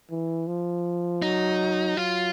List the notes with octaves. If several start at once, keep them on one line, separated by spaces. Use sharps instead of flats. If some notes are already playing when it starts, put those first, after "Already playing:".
E3
F3
F#3 D#4
F#3 F4